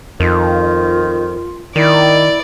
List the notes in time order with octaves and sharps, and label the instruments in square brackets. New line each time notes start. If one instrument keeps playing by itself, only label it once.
[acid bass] F2 [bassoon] D#3 [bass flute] F4
[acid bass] D#3 [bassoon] A#3 [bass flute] E4 [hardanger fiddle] D5